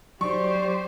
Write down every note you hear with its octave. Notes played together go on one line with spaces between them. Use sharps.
F#3 G4 C5 D5 C#6